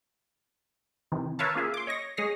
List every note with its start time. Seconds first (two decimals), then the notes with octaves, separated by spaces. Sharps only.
1.12 C3 D#3 E3
1.39 A#4 B4 C#5 E5 F5 A5
1.55 A#3 C#4 F4 G#4 E5
1.74 C6 D6
1.87 C#5 D#5 C#6 A#6
2.17 G#3 G#4 C#5 D#6 A#6 C7